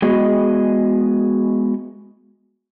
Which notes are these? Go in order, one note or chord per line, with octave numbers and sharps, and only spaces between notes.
G#3 B3 F#4 G#4 D#5